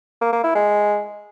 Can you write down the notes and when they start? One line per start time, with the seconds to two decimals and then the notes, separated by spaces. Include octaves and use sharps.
0.21 A#3
0.33 A#3
0.44 E4
0.55 G#3